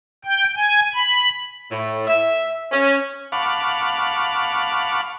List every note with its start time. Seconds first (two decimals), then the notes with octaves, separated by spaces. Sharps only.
0.25 G5
0.56 G#5
0.94 B5
1.70 A2
2.08 E5
2.72 C#4
3.32 F5 F#5 A5 B5 C#6 D6